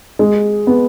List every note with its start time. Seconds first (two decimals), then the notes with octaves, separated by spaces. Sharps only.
0.19 G#3
0.67 B3